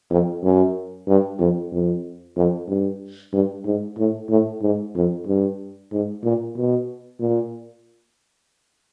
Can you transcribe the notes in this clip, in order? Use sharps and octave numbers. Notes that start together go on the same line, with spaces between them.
F2
F#2
G2
F2
F2
F2
G2
G2
G#2
A2
A2
G#2
F2
G2
G#2
A#2
B2
A#2